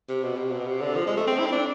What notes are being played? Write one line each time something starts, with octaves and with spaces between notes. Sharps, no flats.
C3
B2
C3
B2
C3
D3
F3
G#3
A3
C4
E4
C4
D4